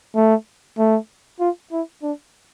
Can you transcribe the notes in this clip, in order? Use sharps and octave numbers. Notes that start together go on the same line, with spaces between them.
A3
A3
F4
E4
D4